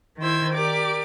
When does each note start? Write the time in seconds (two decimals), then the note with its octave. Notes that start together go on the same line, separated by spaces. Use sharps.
0.19 D#3 E4 C5 E6 G#6
0.54 G4 A#4 D5 D6